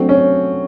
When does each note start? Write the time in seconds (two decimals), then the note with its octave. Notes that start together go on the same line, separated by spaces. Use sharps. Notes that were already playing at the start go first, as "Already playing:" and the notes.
Already playing: F#3 A3 C4 D4 F#4
0.09 C#4